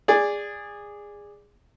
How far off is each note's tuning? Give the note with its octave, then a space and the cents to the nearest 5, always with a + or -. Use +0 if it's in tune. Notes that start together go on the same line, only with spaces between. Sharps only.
G#4 -15 D5 +0